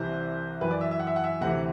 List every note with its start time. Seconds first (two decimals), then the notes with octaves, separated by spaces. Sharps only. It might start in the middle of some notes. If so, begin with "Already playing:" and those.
Already playing: C2 C3 E3 C5
0.61 F#2 E3 B4
0.71 D5
0.81 E5
0.91 E5
0.99 F#5
1.07 E5
1.16 F#5
1.24 E5
1.41 D2 C3 E3 F#5